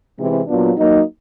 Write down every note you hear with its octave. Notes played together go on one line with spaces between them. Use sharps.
C3 E3 G#3 C4 E4
A#2 F#3 B3 D4 F4
F#3 A#3 D#4